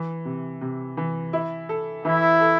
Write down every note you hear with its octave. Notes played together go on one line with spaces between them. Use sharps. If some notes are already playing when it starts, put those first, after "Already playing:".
Already playing: E3
C3
C3
E3
E4
A4
E3 E4
A4